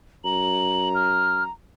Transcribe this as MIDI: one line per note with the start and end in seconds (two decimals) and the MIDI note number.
0.25 1.45 42
0.25 1.51 82
0.25 0.89 102
0.95 1.43 89